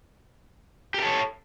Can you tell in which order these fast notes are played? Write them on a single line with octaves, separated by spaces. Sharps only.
G4 A#4 A4 C#5